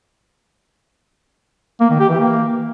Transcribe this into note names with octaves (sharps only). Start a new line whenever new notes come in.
A#3
D#3
G4
E3
A#3